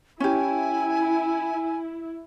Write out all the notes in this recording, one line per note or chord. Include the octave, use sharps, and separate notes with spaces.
C#4 E4 G4 G#5